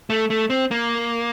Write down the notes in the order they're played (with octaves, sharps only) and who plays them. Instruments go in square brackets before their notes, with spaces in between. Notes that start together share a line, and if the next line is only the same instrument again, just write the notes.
[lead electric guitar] A3
A3
C4
A#3